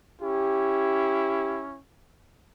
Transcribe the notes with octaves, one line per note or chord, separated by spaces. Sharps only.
C#4 E4 G4